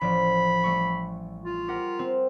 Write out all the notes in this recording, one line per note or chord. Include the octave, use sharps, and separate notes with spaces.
A1 F3 D5 B5
G3 A3 C#6
F4
G4 A#4 F#5
C4